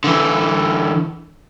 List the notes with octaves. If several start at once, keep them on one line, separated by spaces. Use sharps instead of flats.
D3 E3